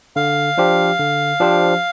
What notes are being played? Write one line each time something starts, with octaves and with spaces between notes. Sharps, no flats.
D3 F5
F3 D4 G4 C5
D3
F3 D4 G4 C5